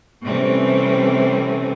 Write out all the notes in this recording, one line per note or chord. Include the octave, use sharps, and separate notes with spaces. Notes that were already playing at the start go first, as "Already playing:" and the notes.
C3 E3 G3 A3 C4 C#4